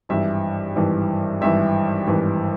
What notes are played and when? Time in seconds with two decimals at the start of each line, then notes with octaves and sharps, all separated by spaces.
0.09 G#1 G2 E3 E5
0.76 G#1 G2 E3
1.41 G#1 G2 E3 E5
2.07 G#1 G2 E3